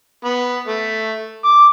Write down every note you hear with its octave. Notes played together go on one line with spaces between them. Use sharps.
B3
A3
D6